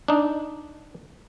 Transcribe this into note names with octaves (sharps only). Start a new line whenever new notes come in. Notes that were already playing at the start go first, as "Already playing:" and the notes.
D4 D#4